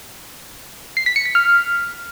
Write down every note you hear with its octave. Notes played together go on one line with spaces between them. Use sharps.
C7
B6
C#7
B6
F6